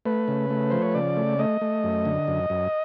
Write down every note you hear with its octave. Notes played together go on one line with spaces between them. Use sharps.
A3 B4
C#3
A3
F3 C5
C#5
C#3 D5
A3
A3 D#5
A3
F#2
D3
F#2
F#2